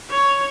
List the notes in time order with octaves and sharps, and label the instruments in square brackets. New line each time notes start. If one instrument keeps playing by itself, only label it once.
[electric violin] C#5